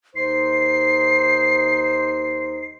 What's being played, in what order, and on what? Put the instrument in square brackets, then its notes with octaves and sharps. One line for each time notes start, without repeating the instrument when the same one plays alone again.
[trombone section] D#2 D#4 C5 [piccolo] C7